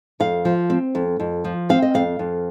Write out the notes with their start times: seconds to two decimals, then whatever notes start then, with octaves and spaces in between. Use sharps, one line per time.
0.20 F2 F5
0.45 F3
0.70 C4
0.95 F2
1.20 F2
1.44 F3
1.69 C4 F5
1.82 D#5
1.94 F2 F5
2.19 F2